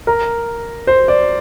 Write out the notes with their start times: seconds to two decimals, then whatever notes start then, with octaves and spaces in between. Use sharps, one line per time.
0.07 A#4
0.87 C5
1.08 D5